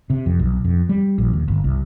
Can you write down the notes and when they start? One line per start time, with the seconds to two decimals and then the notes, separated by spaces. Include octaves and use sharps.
0.10 C3
0.26 F2
0.39 B1
0.64 F2
0.89 G3
1.18 A#1
1.33 D#2
1.48 G1
1.64 C2